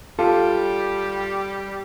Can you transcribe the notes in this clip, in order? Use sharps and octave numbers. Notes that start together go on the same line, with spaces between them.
G3 F4 G4 A4